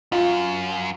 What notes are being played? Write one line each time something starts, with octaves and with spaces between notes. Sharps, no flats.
F#2 F4